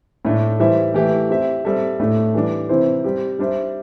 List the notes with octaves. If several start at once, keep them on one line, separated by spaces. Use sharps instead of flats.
A2 A3 D4
E3 G3 E4 C5 E5
E3 A3 E4 G4 E5
C4 G4 E5
G3 C4 A4 E5
A2 A3 D4 A4
E3 G3 D4
C3 E3 C4 E4 C5
G3 C4 G4
G3 D4 C5 E5